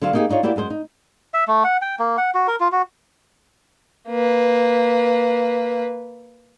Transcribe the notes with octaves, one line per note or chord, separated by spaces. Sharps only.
D3 F#3 C5 F5
A#3 B3 D#4 F4 G4 G#4
D4 D#4 F4 C#5
A#3 E4 F#4 G4 D5 E5
F#2 G#3 A4 C5
D#4
E5
A3
F#5
G5
A#3
F#5
F#4
A#4
F4
F#4
A#3 B4